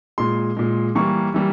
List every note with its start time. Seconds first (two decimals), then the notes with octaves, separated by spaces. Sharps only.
0.18 A#2 G#3 C6
0.57 A#2 G#3
0.95 E3 G3 A#3 C#6
1.34 E3 G3 A#3